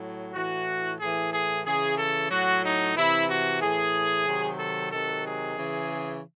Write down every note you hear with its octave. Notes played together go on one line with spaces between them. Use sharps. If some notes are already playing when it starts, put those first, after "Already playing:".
Already playing: A2 F#3
A2 E3 F#4
A2 E3 G#4
G#4
C#3 E3 G#4
A4
A2 F#3 F#4
D#4
C3 E3 E4
F#4
A2 E3 G#4
C3 D#3 F#3
A4
C3 D#3 F#3 A4
G#4
C#3 E3